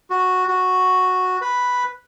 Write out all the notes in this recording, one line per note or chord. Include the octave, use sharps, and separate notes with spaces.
F#4
F#4
B4